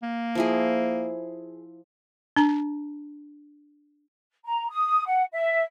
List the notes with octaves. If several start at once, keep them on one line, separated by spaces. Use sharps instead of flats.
A#3
F3 E4 G#4
D4 A#5
A#5
D#6
F#5
E5